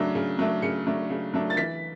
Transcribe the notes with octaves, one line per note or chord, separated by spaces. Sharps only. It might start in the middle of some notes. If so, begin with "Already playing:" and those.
Already playing: C#3 F#3 A3 D4
C#3
F#3 A3 D4
C#3 C#7
F#3 A3 D4
C#3
F#3 A3 D4
A6
E3 B6